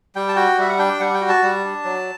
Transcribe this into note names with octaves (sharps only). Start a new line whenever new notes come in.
G3 G5
A5
F#4 G5
G3 E5
F#5
D4 G5
G3 F#5
G5
F#4
A5
G3
D4
F#3